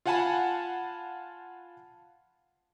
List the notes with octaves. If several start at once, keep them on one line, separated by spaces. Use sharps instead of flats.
F4 F5 F#5 G#5 A5 B5